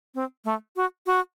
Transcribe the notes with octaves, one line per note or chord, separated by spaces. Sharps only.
C4
A3
F#4
F#4